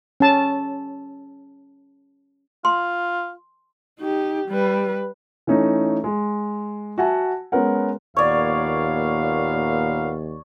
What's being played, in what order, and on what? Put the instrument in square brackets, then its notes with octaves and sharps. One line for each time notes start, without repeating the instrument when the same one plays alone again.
[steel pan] C#4 A5
[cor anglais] F4 [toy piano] C6
[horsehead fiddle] D#4 G4
G3 B4
[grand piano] E3 A3 C#4 D#4
G#3
F#4 E5 F#5 G#5 A5
G#3 B3 C#4 A#4 F#5
[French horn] D#2 [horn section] A#2 B3 F5 [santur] C#5 D5